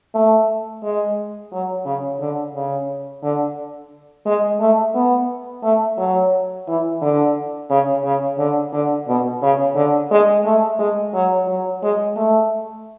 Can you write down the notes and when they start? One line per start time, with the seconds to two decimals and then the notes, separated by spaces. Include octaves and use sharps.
0.14 A3
0.83 G#3
1.52 F#3
1.86 C#3
2.20 D3
2.55 C#3
3.23 D3
4.26 G#3
4.61 A3
4.95 B3
5.63 A3
5.98 F#3
6.68 E3
7.02 D3
7.70 C#3
8.05 C#3
8.38 D3
8.73 D3
9.08 B2
9.42 C#3
9.76 D3
10.11 G#3
10.45 A3
10.79 G#3
11.14 F#3
11.48 F#3
11.83 G#3
12.16 A3